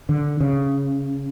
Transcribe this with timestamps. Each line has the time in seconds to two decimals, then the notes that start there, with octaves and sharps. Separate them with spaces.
0.09 D3
0.41 C#3